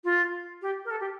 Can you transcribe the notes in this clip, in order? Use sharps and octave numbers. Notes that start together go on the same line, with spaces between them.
F4
G4
A#4
A4
G4